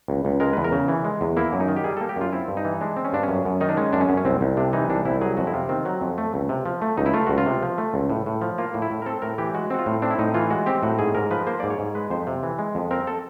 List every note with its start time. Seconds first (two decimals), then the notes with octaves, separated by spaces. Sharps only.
0.08 C#2
0.25 C#2
0.40 G#3 A#4
0.53 E2 B4
0.64 A#4
0.72 C#3
0.88 E3
1.04 G#3
1.21 E2
1.37 A#3 E4
1.53 F#2
1.60 D#4
1.68 D#3
1.77 G4
1.84 G3 G#4
1.97 A4
2.01 A#3
2.09 G4
2.16 F#2 F4
2.32 C4 E4
2.48 G2
2.57 D#4
2.65 E3
2.81 G#3 D4
2.97 C4
3.05 C#4
3.13 G2 D4
3.23 C#4
3.28 F#2
3.45 F#2
3.61 D#3 D#4
3.69 D4
3.77 G#3 C#4
3.93 F#2 D4
4.01 C#4
4.09 F#2
4.17 C#4
4.25 C2 C4
4.41 C2
4.57 C3 D4
4.73 E3 D#4
4.89 C2 D4
5.05 C2 E4
5.21 F#3 G#4
5.37 F2 F#4
5.47 E4
5.53 C3 F4
5.69 D#3 C4
5.85 F#3
6.01 F2
6.18 A3
6.34 C#2
6.49 C3
6.66 F3
6.82 A3
6.97 C#2 D#4
7.06 E4
7.14 A3 F4
7.26 C#2 F#4
7.38 F4
7.46 C3
7.62 F3
7.78 A3
7.94 C#2
8.10 A2
8.26 A2
8.41 F3
8.58 A#3 F4
8.74 A2
8.82 E4
8.91 A2
9.02 A#4
9.06 C4 A4
9.22 A2 A#4
9.38 E3 G4
9.54 G#3 F#4
9.70 C4 F#4
9.79 F4
9.86 A2
10.02 C4 D4
10.11 E4
10.18 A2 D#4
10.34 E3 F4
10.50 G#3 F#4
10.66 C4 G4
10.83 A2 F#4
10.99 G#2 G#4
11.15 G#2 A#4
11.31 F3 B4
11.47 A#3 C5
11.60 G#2 D5
11.70 C#5
11.79 G#2
11.95 G#3 B4
12.10 F2 C5
12.27 C3
12.43 E3
12.59 G#3
12.75 F2
12.91 C4 A#4
13.07 A4